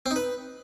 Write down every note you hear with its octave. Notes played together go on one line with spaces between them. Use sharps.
C4
D#4
B4